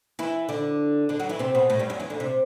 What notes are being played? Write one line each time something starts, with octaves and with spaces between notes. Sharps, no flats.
E3 E4
D3 D4
D3 D4
F#3 F#4
E3 E4
C3 C4
B2 B3
A2 A3
G2 G3
F#2 F#3
E2 E3
D2 D3
C3